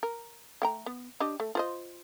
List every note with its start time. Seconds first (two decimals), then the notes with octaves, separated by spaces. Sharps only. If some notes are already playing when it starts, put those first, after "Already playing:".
0.03 A#4
0.62 A3 G5 A#5
0.86 B3
1.20 D4 G4 D#5
1.40 A3
1.55 F4 C5 D#5